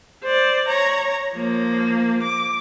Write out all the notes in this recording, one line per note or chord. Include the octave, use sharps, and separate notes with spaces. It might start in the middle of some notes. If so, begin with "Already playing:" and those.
C5 D5
C#5 A#5
F3 A#3
D6